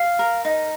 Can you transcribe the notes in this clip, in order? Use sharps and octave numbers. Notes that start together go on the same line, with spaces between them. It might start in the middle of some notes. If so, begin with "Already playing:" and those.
Already playing: F5
A#4
D#4